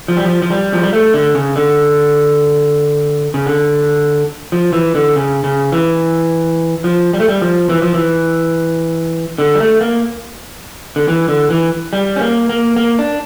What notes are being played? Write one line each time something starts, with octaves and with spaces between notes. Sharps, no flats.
F3
G3
F3
F3
G3
F3
G3
A3
D3
C#3
D3
C#3
D3
F3
E3
D3
C#3
C#3
E3
F3
G3
A3
G3
F3
E3
F3
E3
D3
G3
A3
A#3
D3
E3
D3
E3
G3
C#4
A#3
A#3
A#3
D4